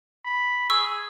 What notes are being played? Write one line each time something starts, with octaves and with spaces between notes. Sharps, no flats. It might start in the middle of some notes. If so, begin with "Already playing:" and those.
B5
G#4 C#6 E6